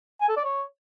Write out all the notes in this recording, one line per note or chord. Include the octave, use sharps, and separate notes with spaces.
G#5
A4
D5
C#5